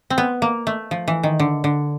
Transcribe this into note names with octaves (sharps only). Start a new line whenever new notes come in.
C4
B3
A#3
A3
F3
E3
D#3
D3
D3